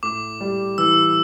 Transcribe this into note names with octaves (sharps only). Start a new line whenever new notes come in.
A2 D6
G3
E3 E6